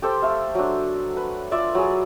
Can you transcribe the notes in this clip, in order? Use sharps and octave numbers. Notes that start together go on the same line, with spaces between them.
G4 A4 C5 G5
A3 E5 F5
F#3 D4
B4
F4 D5 E5
F#3 G#4